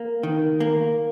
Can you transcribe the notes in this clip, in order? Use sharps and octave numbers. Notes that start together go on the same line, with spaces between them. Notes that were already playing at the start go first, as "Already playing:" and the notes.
Already playing: A#3
D#3
A#3